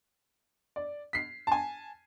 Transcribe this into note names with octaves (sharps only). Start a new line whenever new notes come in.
D5
B6 C7
G#5 A5